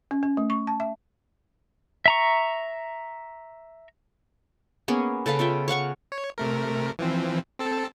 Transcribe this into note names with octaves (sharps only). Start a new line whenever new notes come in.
C#4
C#4
A3
C#6
A5
E5
E5 A#5 C#6
A#3 B3 C#4 G#4
C#3 A4 B4 F5
C#4 F4 E5 G5
C#5 F5 F#5 C#6
C#5
C3 A3 A#4
E3 F3 C4
C4 A4 A5